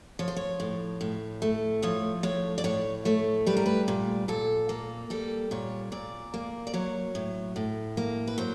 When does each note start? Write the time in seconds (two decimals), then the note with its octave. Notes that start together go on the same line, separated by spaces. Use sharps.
0.19 F3 C#5
0.28 C5
0.36 C#5
0.60 A2
1.01 A2
1.42 A3
1.82 F3 C#5
2.23 A2 C#5
2.58 D5
2.64 A2 C#5
3.05 A3 C#5
3.47 G3 B4
3.57 A#4
3.66 B4
3.88 A#2
4.28 A#2 A4
4.69 A#3
5.10 G3 A4
5.51 A#2 C#5
5.92 A#2 D5
6.34 A#3
6.67 D5
6.74 F#3 C#5
7.15 A2
7.56 A2
7.97 A#3
8.27 B4
8.38 F#3 C5